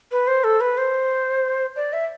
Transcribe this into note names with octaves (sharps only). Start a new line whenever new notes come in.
B4
C5
A4
B4
C5
D5
E5